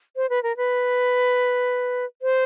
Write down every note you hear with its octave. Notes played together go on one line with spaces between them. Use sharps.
C5
B4
A#4
B4
C5